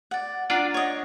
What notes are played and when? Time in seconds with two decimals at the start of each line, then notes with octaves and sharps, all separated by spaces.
0.11 D5 F#5
0.50 D4 F4 D5 F#5 A#5
0.74 C#5 D#5